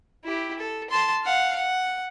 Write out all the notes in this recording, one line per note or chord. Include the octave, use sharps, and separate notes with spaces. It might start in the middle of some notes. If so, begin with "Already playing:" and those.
E4 G4
A4
A5 C6
F5 F#5
F#5